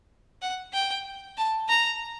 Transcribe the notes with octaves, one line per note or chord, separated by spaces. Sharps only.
F#5
G5
A5
A#5